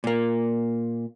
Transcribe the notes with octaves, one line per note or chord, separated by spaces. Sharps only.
A#2 A#3